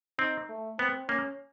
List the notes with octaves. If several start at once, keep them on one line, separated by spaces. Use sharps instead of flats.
C4 D#4
A3
B3 C4
A#3 C#4